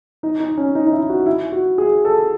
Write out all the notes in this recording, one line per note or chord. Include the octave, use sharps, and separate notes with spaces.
D#4
D#4
C#4
D#4
D#4
E4
F#4
E4
F#4
G#4
A4